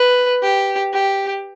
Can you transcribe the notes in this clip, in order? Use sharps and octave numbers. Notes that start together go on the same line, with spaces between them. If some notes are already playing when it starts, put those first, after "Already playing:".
Already playing: B4
G4
G4